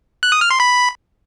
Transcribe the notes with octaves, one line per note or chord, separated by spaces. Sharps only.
F#6
D#6
F6
C6
B5